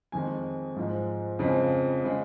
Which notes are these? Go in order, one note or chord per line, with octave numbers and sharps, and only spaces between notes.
F2 D#3 G#3 G#5
G#2 F3 G#3
F2 C#3 F3 G#3
C#3 G#3